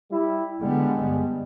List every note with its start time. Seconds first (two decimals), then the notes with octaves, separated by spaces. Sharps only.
0.11 G3 E4
0.61 D3 G3 G#3 B3
1.05 G2